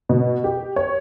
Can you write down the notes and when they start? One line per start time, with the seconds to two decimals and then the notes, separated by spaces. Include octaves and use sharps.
0.09 B2
0.44 G4
0.76 C#5